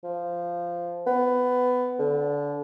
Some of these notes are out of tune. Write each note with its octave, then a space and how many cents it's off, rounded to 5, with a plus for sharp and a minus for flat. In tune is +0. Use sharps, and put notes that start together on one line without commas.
F3 -10
B3 +15
D3 -25